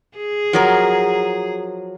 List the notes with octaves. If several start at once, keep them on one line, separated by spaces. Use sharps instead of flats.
G#4
F3 F#3 A#4